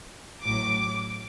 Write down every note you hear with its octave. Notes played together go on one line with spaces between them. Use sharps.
A1 A2 F#3 D6